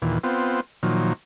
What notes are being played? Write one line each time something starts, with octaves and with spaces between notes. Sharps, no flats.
D#2 A#2 E3
B3 C4 F4
A#2 D#3 F3 F#3